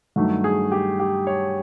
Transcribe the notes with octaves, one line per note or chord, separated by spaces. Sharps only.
G2 D#3 F#3 A3
G#4
G4
G4
C#5